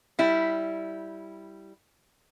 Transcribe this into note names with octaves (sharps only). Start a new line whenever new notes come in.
G3 E4